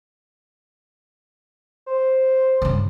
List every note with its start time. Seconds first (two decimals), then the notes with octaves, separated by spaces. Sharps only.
1.87 C5
2.62 G2 C#3